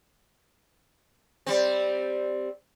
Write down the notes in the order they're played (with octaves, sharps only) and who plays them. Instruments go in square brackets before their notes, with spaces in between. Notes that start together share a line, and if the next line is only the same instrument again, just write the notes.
[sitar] G3 C4